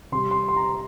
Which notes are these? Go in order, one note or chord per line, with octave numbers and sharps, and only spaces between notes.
C3 G3 C6
C6
C6
A#5